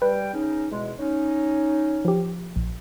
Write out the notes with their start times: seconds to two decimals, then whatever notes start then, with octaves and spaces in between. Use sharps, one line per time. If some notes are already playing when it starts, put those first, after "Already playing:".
0.02 G3 B4 G5
0.33 C#3 C#4 D#4
0.71 E2 B2 G#3
1.00 C#4 D#4
2.05 F3 G4
2.56 A#1